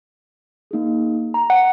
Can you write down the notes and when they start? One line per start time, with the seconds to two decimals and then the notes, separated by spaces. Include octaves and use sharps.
0.71 A#3 D#4 G#4
1.34 A#5
1.50 F#5